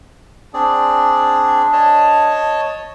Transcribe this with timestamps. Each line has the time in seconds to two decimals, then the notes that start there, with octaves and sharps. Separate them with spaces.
0.54 C4 D4 G#4 D5
1.73 C#5 D#5 A5